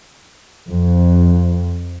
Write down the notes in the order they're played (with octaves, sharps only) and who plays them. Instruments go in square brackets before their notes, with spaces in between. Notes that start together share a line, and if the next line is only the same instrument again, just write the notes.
[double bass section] F2